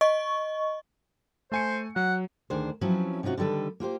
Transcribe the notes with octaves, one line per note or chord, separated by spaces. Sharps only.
D#5 C#6
A3 C5 G#5 C#7
F#3 F#5
D2 D#3 D4 G#4 C5
F3 F#3 C4 C#4 E4 B4
C3 C#4 D#4 F4 F#4
D3 D#3 G3 A4 B4
A#3 F4 G4 C5